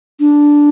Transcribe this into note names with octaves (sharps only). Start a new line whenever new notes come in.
D4